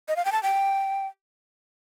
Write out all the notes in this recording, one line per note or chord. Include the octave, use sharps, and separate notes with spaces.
D#5
F5
G5
A5
G5